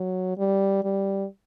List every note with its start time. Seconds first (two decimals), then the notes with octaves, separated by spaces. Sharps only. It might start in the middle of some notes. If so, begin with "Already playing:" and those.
Already playing: F#3
0.38 G3
0.84 G3